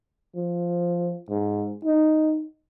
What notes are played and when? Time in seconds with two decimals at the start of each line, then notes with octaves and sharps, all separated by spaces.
0.36 F3
1.30 G#2
1.85 D#4